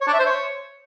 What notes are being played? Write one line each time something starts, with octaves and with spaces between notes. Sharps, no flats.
C#5
D4
E5
C5
C#5